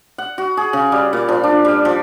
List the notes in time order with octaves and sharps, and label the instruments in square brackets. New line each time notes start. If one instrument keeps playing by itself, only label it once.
[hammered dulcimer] F#5
F#4
G#4
C#3
G3
A#2
F3
D4
G3
F3